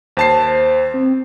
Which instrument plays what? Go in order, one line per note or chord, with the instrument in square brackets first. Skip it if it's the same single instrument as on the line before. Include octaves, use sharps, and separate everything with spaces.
[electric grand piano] D#2 A5 C7 [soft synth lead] C5
[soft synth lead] C4